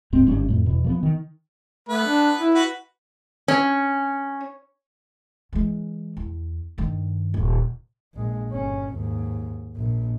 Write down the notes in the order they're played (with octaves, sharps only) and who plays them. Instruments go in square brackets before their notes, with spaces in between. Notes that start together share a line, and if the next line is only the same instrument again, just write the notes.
[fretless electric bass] D1 G#2 C4
G1 G#2 G3 C#4
F2 A2
E2 B2
F3 A3 B3
D#3
[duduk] A3 [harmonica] B3 B4
[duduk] D4
E4
[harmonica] F#4 B4 B5
[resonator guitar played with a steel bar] C#4
[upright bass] E3 G#3
E2
G2 D#3
D#1
[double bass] A#1 G#3
G1 C#4
D#2 G#2
A#1